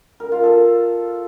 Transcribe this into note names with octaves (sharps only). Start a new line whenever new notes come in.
A#4
F4
A4